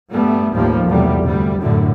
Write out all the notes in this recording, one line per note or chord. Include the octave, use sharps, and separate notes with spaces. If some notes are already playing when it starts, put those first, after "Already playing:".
G2 G3 A3 B3
A1 D#2 F3 G3 A#3
B1 E2 C3 G3 A3
G1 D2 G3
F#2 A2 D3